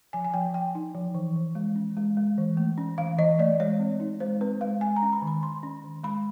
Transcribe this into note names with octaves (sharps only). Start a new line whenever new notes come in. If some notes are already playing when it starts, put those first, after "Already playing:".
F3 G#5
G#5
F3 G5
F3 G5
D#4
F3
E3
E3
G#3
C#4
G#3
G#3
E3
A3
C#4
E3 F5
E3 D#5
A3 D5
G#3 C#5
C4
D#4
G#3 C5
C4 B4
G#3 F5
G#3 G#5
A#5
C#4
B5
D#3
B5
D#3 C6
C#4
D#3
G#3 B5